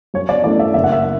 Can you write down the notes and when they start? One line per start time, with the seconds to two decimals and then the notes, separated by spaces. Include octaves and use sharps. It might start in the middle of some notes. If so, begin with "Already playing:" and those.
0.14 F#2 C#5
0.29 D5
0.44 E3 A3 C#4 D5
0.59 E5
0.74 F#1 E5
0.84 F#5
0.92 E5